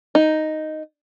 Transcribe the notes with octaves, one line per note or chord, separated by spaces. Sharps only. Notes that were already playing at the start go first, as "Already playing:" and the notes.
D#4